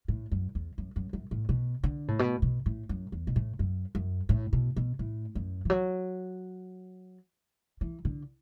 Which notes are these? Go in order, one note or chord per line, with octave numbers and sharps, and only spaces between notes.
A2
F#2
E2
F#2
F#2
F#2
A2
B2
D3
A2
B2
B2
A2
F#2
E2
B2
A2
F#2
F#2
A2
B2
B2
A2
F#2
E3
F#3
E3
D3